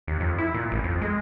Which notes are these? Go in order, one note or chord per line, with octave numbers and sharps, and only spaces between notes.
D#2
F2
E4
A#2
A1
F2
G#3